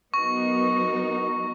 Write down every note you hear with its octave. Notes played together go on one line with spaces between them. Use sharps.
F#3 B3 D#4 F#4 A#4 C#6